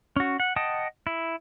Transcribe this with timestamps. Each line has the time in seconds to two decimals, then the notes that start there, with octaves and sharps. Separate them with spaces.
0.16 C#4 F#4
0.40 F#5
0.56 D#5 F#5 G5 A5 D#6
1.07 E4